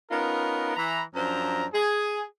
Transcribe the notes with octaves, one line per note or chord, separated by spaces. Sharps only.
B3 C#4 D#4 F4 A#4
E3 A#5 B5
F#2 F3 D4 C5 A#5
G#4